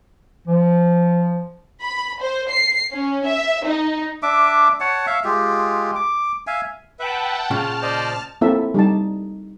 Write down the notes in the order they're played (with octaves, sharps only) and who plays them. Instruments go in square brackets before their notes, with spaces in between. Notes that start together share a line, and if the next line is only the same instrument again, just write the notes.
[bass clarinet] F3
[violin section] B5
C5
C7
C#4
E5
D#4
[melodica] D4 E5 D6
C#5 F#5 A5
E5 F5
G#3 F4 G4
D6
E5 F5 G#5
[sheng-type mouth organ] B4 E5 [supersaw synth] F#5 G5 A5
[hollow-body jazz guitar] A#2 C#3 C#4 [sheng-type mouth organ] F4 [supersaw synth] A5 F6
[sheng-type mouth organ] C5 D5 D#5
[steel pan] A#3 C4 E4 A4 E5
G3 D#4 A5